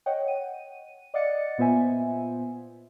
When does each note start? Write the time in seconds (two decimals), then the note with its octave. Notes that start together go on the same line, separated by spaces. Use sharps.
0.06 C#5 D#5 F#5 G5
0.28 D#7
1.14 D5 D#5 F5 F#5 A6 C#7
1.58 A#2 B3 F4 C5 E5 G#5